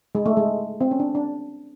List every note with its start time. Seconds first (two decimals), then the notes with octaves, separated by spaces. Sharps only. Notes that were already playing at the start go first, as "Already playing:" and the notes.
0.15 G#3
0.26 A3
0.37 G#3
0.81 C4
0.91 C#4
1.00 D4
1.15 D4